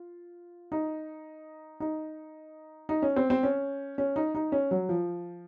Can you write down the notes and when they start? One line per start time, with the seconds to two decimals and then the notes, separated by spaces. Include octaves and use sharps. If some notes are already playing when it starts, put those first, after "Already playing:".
Already playing: F4
0.72 D#4
1.80 D#4
2.89 D#4
3.02 C#4
3.16 C4
3.30 C4
3.43 C#4
3.98 C#4
4.16 D#4
4.35 D#4
4.52 C#4
4.71 F#3
4.89 F3